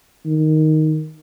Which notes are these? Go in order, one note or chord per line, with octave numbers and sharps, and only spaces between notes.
D#3